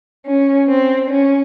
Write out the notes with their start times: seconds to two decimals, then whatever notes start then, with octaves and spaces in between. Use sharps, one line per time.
0.27 C#4
0.68 C4
1.10 C#4